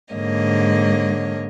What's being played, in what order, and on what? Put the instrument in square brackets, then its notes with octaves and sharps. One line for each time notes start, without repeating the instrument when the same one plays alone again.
[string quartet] G#2 D3 A#3 C#5 D#5